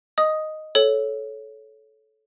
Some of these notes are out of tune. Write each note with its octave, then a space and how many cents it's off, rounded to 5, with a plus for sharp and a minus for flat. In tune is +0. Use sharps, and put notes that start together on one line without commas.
D#5 +0 D#6 +0
A4 -15 C#5 +0